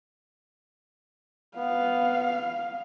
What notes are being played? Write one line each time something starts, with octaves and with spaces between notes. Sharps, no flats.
B3 F5